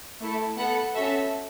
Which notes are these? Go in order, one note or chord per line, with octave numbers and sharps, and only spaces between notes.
A3 E4 A4
B3 A4 F#5 B5
C#4 F#4 A4 E5 A5